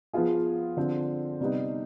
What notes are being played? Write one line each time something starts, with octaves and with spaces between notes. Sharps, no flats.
F3 B3 F4 G#4
D3 F3 C4
C3 G3 B3 D#4